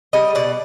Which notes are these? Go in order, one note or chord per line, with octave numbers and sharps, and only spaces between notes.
G3 D#5
B2 D5